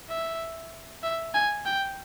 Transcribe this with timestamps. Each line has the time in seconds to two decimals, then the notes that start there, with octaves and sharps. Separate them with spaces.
0.10 E5
1.03 E5
1.34 G#5
1.66 G5